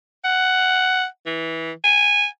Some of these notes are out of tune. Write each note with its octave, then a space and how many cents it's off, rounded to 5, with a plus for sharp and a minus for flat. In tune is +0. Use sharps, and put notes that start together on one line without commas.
F#5 +5
E3 -15
G#5 -10